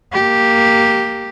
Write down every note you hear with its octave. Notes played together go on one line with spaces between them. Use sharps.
A#3 G4